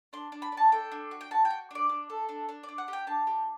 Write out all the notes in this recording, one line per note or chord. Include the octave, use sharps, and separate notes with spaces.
D4 C6
D4
B5
D4
A5
A4 G5
D4
F#4
G5
F#4 A5
G5
F#4
D4 D5
D4
A4
D4
D4
D5
D4
F#5
G4
G5
D4 A5
G4